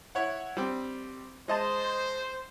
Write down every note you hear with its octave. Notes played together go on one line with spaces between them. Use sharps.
E4 C#5 F#5
G3 C4
G#3 C5 D#5 A5